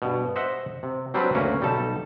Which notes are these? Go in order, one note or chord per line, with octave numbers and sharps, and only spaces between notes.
G2 B2
C5 D#5 E5 F#5
C3
F#3 G3 C4 D4 B4 C5
D2 A#3 C#4 F#4 B4
B1 G3 D#4 A4 A5